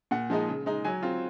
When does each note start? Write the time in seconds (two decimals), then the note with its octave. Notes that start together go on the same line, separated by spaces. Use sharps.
0.11 A#2 F#5
0.30 F3 G#3 D#4
0.48 C#3
0.66 G#3 D#4
0.85 F#3 G#5
1.03 C4 F4